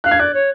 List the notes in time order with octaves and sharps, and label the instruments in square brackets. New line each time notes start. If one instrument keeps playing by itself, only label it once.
[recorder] F5 [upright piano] F#6
[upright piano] G#6
[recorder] D5 [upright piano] F#6
[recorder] C#5